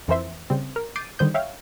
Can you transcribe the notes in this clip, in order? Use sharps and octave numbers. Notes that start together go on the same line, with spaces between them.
F2 E3 A#4 C5 E5 C6
C#3 G3 C4
A#4
D6 G6 A6 C7 D7 D#7
D3 D#3 G3 C5 D#6 G6
C#5 E5 F5 G5